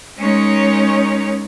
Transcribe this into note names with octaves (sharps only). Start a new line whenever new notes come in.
G#3 C#4 D#4 A#4 C#5